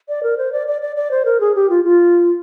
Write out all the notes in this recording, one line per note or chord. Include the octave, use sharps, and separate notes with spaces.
D5
A#4
C5
D5
D5
D5
D5
C5
A#4
G#4
G4
F4
F4